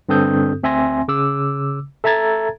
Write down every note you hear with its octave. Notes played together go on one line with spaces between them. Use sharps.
G2 D3 C4 A4 D#6 G6
D2 C4 E5 G#5 C6 A#6
C#3 D6 E6
A4 E5 A5 A#5 G#6 A6